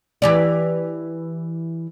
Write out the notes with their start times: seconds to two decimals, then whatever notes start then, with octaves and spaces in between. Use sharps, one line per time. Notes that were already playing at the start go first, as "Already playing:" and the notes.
0.22 E3 G4 D5